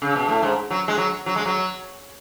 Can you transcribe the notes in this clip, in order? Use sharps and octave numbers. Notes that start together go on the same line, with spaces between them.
C#3
B2
A2
G#2
F#3
G#3
F#3
F#3
G#3
F#3